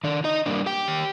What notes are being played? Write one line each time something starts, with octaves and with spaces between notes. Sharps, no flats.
D#3 D4 D5
D#4 D#5
G3 A#3 D4
G4 G5
D#3